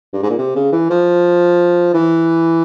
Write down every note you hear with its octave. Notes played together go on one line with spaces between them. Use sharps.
G2
G#2
A#2
C3
C#3
E3
F3
E3